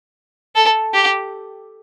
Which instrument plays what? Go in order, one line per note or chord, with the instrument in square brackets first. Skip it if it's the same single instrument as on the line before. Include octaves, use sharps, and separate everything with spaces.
[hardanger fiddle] A4
G4